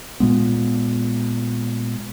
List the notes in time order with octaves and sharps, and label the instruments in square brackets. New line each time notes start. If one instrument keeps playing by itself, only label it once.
[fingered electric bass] A#2 G#3 B3